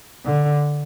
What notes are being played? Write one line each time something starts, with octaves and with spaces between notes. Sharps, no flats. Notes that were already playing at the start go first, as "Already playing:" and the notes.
D3